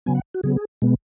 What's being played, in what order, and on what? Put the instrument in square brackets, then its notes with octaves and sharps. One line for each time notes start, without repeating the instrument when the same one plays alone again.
[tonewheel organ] C#3 F#3 B3 G#5
F#5
F#4
C#3 F#3 B3 G#4
G#4
B2 G#3 B3